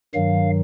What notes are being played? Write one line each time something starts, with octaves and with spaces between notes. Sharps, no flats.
G2 D#3 F#3 F5